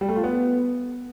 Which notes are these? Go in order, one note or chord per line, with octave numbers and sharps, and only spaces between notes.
G3
A3
F4
B3